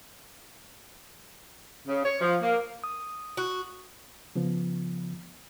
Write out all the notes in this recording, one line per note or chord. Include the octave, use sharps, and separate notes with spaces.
C#3
C#5
F3
A#3
D#6
F#4
C#3 F3 B3